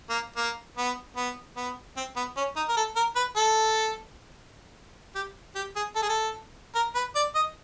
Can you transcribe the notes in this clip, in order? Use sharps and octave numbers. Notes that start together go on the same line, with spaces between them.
A#3
A#3
B3
B3
B3
C4
B3
C#4
D#4
A#4
A4
A#4
B4
A4
G4
G4
G#4
A4
G#4
A4
A#4
B4
D5
D#5